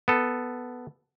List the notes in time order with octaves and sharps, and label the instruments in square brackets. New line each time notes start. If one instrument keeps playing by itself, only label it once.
[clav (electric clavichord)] B3 A4